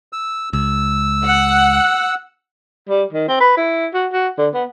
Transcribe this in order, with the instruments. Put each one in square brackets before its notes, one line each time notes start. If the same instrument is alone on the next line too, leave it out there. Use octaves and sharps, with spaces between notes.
[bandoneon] E6
[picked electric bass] C#2 [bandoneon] E6
[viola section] F#5
[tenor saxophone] G3
D#3
C4
B4
E4
F#4
F#4
D3
B3